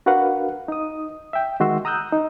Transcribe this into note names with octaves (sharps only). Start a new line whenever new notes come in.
D4 F#4 A#4 B4 F5 F#5
D#4 D#6
E5 G5
D#3 G#3 F#4 C6 E6
A#5 D#6 E6 F#6 G6
D#4